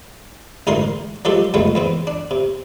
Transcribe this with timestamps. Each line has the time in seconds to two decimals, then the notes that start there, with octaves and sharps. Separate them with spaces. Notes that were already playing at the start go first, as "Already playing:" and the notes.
0.67 A1 G#2 D3 E3 A#4 C6
1.25 F3 F#3 G#3 G4 A4
1.54 F2 C#3 F#3 G#3 A3 B3
1.75 E2 B3 C4
2.07 D4
2.31 C3